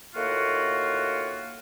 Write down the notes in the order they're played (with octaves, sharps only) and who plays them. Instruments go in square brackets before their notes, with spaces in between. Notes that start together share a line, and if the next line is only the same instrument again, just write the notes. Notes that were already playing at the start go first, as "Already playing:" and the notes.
[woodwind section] A2 D#3 A#3 F4 F#4